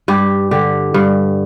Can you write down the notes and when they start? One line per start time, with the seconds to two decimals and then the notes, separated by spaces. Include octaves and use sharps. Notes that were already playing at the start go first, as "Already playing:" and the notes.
0.08 G2 G4
0.51 D3 G4
0.94 G2